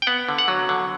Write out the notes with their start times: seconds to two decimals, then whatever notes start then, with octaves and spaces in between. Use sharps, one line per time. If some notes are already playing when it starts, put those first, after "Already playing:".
0.02 G5
0.07 B3 F#5
0.29 D3
0.38 F#5
0.48 F#3
0.69 D3